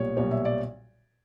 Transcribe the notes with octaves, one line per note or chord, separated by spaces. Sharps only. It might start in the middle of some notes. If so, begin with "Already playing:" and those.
Already playing: B1 A#2 G3 C#5
B1 A#2 G3 C#5
E5
D5